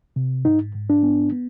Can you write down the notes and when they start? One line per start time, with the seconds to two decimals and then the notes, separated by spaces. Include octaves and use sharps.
0.16 C3
0.45 G#2 D#4
0.75 G#2
0.90 D4
1.03 B3
1.32 B3